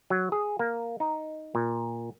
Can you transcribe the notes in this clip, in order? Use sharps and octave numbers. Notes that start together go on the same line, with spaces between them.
F#3
G#4
A#3
D#4
A#2